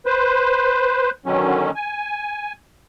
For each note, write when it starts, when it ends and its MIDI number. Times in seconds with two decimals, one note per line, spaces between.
0.06 1.10 71
0.06 1.10 72
1.26 1.71 47
1.26 1.71 50
1.26 1.71 51
1.26 1.71 54
1.26 1.71 61
1.75 2.53 80